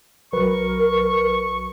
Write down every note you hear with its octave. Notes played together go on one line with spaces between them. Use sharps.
B1 F#3 A#4 B4 C#6